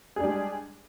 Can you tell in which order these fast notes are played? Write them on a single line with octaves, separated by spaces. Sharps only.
G#4 D4 G3 G#3